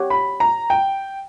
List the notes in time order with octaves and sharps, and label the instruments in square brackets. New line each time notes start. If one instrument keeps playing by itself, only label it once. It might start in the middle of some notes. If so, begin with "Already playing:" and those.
Already playing: [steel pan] G4 C#5 F#5
[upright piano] B5
A#5
G5